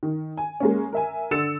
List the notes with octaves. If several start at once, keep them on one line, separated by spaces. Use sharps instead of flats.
D#3
G#5
G#3 A#3 C#4
A#4 E5 G#5
D3 E6 A6 C#7 E7